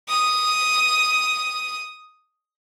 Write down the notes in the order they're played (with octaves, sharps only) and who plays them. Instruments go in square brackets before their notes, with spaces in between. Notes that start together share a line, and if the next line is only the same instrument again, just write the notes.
[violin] D#6